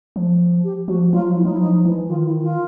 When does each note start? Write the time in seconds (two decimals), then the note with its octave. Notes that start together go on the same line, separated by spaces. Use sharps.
0.16 F3
0.64 G4
0.88 F3 F#4
1.12 F#3 F4
1.29 F3
1.37 E4
1.44 F#3 D#4
1.53 E4
1.61 F3 D#4
1.85 E3 E4
2.09 D#3 F4
2.26 E4
2.41 F4